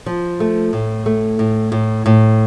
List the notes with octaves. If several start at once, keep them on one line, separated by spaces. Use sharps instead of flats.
F3
A3
A2
A3
A2
A2
A2